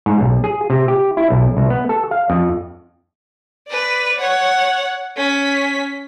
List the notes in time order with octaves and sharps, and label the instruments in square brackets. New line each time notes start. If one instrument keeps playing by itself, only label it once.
[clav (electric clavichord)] G#2
B1
G#4
C3
G4
E4
B1
C2
B3
A4
F5
F2
[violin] B4 D5
C#5 F#5
C#4 B6